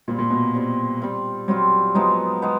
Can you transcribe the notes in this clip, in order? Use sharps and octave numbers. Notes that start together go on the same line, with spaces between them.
A#2 G3 C4 F4
A#2
B2
G3 C4 F4
G3 C4 F4
F#3 G3 C4 F4
F3 F#3 G#3 B3 D#4
G#3 B3 D#4